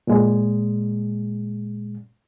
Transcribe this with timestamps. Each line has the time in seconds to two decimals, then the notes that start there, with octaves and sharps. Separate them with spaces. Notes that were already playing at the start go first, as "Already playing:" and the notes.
0.07 A#2 G#3